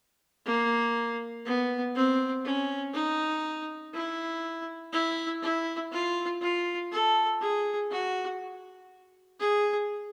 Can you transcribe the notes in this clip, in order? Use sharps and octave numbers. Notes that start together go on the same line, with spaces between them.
A#3
B3
C4
C#4
D#4
E4
E4
E4
F4
F4
A4
G#4
F#4
G#4